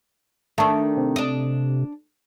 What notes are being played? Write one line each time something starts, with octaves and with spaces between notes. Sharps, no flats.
D#3 A3 D4
C3
D4 D#5